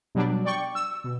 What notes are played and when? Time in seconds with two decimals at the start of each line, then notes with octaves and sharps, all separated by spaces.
0.15 B2 F#3 G3 D4
0.45 D5 G5 C#6
0.75 E6
1.04 B2